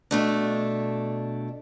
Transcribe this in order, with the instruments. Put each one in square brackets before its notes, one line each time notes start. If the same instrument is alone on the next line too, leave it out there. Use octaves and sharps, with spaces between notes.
[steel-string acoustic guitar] B2 A3 D4